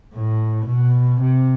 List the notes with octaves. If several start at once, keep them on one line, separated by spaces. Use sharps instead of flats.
A2
B2
C3